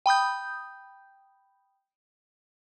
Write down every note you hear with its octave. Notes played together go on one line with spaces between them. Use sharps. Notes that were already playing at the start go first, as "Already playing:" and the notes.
G5 B5 D#6 G6